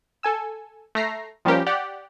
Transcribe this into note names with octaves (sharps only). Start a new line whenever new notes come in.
A4 G#5 E6
A3 E5 A#5 C7
F3 G3 A#3 C#4 G4 A#4
G4 D5 F#5